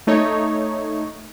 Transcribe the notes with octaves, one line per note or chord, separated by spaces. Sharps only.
A3 D#4 C#5